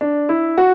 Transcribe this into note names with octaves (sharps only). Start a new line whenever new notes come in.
D4
E4
F#4